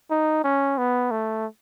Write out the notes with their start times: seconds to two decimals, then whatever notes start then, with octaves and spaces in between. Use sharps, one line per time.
0.11 D#4
0.44 C#4
0.78 B3
1.11 A3